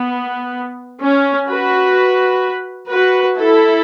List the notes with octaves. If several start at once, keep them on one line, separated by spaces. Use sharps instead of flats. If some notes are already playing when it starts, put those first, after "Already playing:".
Already playing: B3
C#4
F#4 B4
F#4 B4
E4 A4